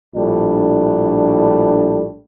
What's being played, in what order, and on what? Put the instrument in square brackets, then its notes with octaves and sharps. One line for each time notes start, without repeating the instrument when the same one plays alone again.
[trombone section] A#1 A2 G3 D4